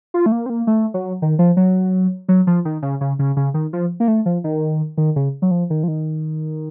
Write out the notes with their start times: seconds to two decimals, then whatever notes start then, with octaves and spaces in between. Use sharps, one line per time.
0.14 F4
0.26 A3
0.32 A#3
0.46 C4
0.50 A#3
0.67 A3
0.94 F#3
1.22 D#3
1.39 F3
1.57 F#3
2.29 F#3
2.47 F3
2.65 D#3
2.82 C#3
3.01 C#3
3.19 C#3
3.37 C#3
3.54 D#3
3.73 F3
4.00 A#3
4.08 A3
4.26 F3
4.44 D#3
4.98 D#3
5.16 C#3
5.42 F#3
5.51 F3
5.70 D#3
5.83 F3
5.88 D#3